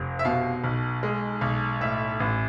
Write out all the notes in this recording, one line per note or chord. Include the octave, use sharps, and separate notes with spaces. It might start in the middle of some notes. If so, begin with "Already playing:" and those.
Already playing: F1
E5
B2 F5
B1
G#3
B1
A2 E5
A1